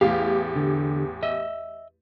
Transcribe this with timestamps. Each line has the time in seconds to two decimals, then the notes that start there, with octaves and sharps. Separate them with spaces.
0.01 A1 E2 G4 F5
0.56 D3
1.23 D#5 E5